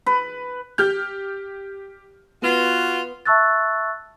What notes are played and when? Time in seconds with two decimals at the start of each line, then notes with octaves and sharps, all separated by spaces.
0.06 B4
0.78 G4 F6 G6
2.42 B3 F4 F#4
3.26 E5 A5 C#6 E6 F#6 A6